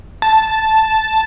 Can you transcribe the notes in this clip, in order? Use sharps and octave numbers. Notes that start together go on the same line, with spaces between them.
A5